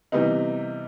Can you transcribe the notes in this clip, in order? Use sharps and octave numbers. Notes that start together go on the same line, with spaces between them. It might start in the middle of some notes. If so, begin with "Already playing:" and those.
C3 E3 G3 B3 D#4